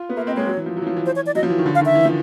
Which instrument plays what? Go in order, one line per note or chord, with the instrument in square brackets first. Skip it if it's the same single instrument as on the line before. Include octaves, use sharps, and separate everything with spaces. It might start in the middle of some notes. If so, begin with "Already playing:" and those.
Already playing: [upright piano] F4
B3
[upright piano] A#3 [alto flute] E5
[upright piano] C4 [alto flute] D#5
[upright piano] G#3 [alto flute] C#5
[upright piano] F#3
E3
F3
F#3
E3
F3
E3
[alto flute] C5
C#5
D5
[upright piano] F#3 [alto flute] D#5
[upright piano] F3
E3
D#3
D3
[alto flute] F5
[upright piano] D#3 [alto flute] E5
[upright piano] E3
F3